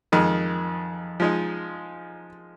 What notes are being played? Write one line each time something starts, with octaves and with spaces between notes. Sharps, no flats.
F2 D#3 G#3
F3 G#3 D#4